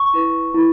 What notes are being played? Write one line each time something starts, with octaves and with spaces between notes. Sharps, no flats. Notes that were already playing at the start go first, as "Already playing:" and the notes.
Already playing: C#6
E4 B4
E4 B4